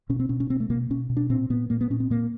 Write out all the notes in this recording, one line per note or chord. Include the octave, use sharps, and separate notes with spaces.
B2 C#4
C4
B2 C#4
C#4
B2 C4
A3
B2 A#3
B2 C#4
B2
D4
A#2 C4
A#2 B3
A#2 A#3
B3
A#2 C#4
C4
A#2 A#3